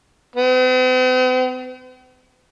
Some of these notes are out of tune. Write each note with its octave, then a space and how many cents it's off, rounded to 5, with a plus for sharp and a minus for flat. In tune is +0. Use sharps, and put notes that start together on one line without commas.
C4 -45